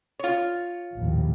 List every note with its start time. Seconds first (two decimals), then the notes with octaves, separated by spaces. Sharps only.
0.19 F4 C#5
0.96 A#1 D#2 A2